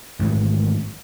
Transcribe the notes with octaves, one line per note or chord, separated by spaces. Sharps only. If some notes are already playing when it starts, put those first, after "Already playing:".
A1 G#2 D#3 F#3